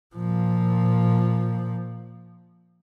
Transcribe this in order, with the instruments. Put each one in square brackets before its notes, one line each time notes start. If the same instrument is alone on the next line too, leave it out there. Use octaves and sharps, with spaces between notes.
[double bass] A#2 F3